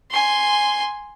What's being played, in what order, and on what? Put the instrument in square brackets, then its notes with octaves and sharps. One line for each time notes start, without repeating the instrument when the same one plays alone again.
[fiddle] G#5 C6